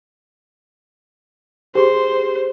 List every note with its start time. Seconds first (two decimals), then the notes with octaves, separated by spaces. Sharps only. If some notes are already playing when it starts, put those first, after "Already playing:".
1.75 G4 G#4 C5 C6